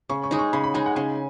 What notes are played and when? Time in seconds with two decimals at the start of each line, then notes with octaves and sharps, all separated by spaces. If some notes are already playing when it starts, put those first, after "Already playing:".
0.09 C#3 C#6
0.24 C#6
0.31 G#3 D#4 D#6
0.39 C#6
0.53 C#3 B5
0.64 B5
0.74 G#3 D#4 G#5
0.86 F#5
0.96 C#3 G#5